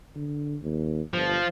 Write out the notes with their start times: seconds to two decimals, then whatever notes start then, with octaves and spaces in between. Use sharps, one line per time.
0.16 D3
0.62 D#2
1.14 G1 F3